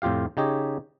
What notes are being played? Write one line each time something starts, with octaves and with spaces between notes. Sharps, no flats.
F2 A2 F4 G4 F5
C#3 D#4 G4 C#5 D#5